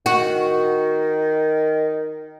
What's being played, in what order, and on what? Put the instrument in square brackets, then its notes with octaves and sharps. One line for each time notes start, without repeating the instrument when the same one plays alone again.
[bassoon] D#3 [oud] F#4